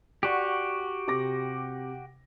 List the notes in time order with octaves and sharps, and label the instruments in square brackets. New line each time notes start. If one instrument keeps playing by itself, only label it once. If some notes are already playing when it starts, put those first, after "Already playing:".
[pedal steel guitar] F#4 G4 [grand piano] D5 F#5 C#6
[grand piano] C3 D6 A#6